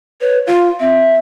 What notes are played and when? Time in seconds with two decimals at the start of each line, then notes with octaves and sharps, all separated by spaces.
0.21 B4 C#5
0.47 F4 F5
0.80 C4 E5